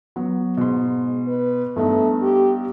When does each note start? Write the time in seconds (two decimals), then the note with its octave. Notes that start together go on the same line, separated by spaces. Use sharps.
0.16 F#3 B3
0.57 G#2 B2 C6
1.28 B4
1.76 G2 A3 B3 D#4
2.22 G4